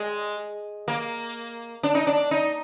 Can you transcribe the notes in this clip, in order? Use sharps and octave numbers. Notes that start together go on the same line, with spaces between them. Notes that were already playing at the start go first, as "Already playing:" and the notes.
Already playing: G#3
A#3
D4
D#4
D4
D#4